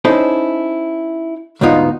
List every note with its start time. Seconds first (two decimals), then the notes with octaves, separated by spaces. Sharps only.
0.05 C#4 D#4 E4 A4 C5 D#5
1.61 D2 G#2 B2 B3 D#4 F4